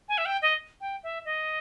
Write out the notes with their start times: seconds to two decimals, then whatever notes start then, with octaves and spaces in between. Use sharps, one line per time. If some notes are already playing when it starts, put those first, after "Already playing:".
0.09 G#5
0.18 E5
0.26 G5
0.42 D#5
0.81 G5
1.03 E5
1.25 D#5